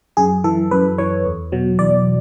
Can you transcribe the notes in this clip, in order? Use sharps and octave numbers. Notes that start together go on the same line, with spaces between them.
F#2 G#4
E3 A4
F#2 B4
E3 C#5
E2
B2 F#3
E2 D5